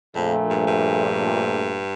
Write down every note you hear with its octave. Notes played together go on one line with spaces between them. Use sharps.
A#1 F2 A#2 A3
G2
G2